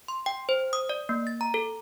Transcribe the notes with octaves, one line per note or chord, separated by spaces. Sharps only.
C6
G5
C5
D#6
D5
A#3
A6
A#5
A4